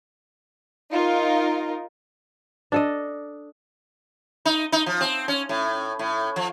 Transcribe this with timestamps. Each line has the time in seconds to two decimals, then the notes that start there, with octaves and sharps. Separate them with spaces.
0.92 D#4 F4 A#4
2.72 D4 A4 D#5
4.46 D#4
4.72 D#4
4.86 F3
5.01 C4
5.28 C#4
5.49 A2
5.99 A2
6.36 F3